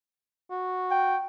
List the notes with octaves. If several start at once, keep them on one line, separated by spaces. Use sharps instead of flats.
F#4
G5